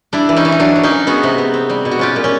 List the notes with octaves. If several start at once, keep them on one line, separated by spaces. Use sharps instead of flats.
G3 D4 E4
E3
C#4 D#4
E3
C#4
F#3 D4
F#3
C#4 D#4
F#3
B3 F#4 G#4
C3
B3
C4
G3
B2
F#4
C#4 F4 G4
A#2
C#4